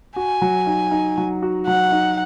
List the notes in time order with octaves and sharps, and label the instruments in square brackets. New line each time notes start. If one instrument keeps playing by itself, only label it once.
[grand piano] F#4 [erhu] G#5
[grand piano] F#3
D#4
D#4
F#3
F#4
[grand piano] F#3 [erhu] F#5
[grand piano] D#4